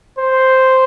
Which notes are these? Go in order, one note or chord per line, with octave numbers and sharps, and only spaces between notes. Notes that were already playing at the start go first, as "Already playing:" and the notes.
C5